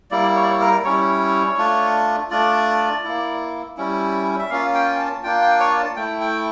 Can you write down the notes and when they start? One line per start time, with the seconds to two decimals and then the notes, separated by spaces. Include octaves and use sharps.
0.11 G3 A#3 E4 D5
0.36 C#5
0.43 D5
0.50 C#5
0.60 A#4
0.84 G3 C#4 E4 C#5
1.58 A3 D4 F4
2.31 A3 D4 F4 D5
3.04 A#3 E4
3.77 G3 C#4 E4
4.39 E5
4.50 A#3 C#4 F4 F5
4.74 G5
4.99 A5
5.23 A#3 D4 F4 G5
5.42 G5
5.60 C#5
5.78 A5
5.96 A3 E4 G5
6.21 G5